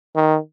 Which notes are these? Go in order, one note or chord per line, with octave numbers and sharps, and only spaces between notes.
D#3